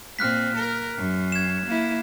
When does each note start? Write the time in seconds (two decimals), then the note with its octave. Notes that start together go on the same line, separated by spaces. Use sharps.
0.19 A#2 C4 F6 F#6 B6
0.56 A#4
0.97 F#2
1.32 G#6 E7
1.66 A#3 E4